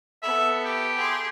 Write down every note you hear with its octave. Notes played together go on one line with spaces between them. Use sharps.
B3 A4 E5
G4
G#4 C6